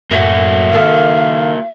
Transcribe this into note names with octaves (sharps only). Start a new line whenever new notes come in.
F#2 A2 A#3 F#4 E5
D#3 A4 F5